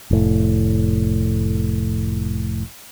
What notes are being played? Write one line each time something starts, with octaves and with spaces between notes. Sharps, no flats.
F1 A2